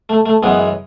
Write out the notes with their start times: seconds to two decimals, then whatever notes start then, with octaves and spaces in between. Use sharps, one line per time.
0.09 A3
0.26 A3
0.43 F#2 E3 G#3 B3